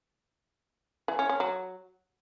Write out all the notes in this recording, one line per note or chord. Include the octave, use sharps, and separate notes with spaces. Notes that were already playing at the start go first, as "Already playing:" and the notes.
E3
C#4
C#4
F#3